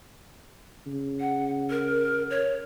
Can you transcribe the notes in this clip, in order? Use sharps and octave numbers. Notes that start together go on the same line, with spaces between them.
C#3
F#5
A#4
C#5